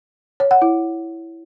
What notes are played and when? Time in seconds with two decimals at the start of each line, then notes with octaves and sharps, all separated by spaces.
0.40 C#5
0.51 F#5
0.62 E4